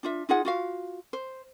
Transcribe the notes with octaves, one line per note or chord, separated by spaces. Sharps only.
D4 F4 E5
D#4 F4 G#4 F#5
F4 F#4 F5
C5